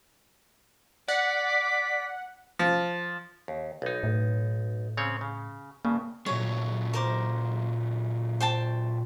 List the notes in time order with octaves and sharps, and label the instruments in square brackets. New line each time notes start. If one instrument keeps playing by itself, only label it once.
[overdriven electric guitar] D5 [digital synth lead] F#5 [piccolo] B6
[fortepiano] F3
[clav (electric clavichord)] D#2
B1 D#4
[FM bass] A2
[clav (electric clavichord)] C#3 C4 C#5
C#3
[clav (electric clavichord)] G2 C#3 [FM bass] A#3
[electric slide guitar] A#2 F#3 G#3 [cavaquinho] C#5
[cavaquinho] A#4 C5 D6
C5 G5 A5